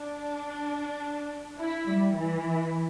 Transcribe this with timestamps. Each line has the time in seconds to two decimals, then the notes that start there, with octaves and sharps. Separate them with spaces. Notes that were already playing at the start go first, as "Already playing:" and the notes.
Already playing: D4
1.58 E4
1.87 G3
2.18 E3